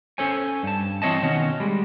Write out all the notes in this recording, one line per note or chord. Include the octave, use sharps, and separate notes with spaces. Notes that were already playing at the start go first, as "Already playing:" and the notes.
C#4 A4 C5 C#5 G#5
G2 A5
E3 C4 C#5 D#5 A5
B2 D#3 C#4 F#4
G3 G#3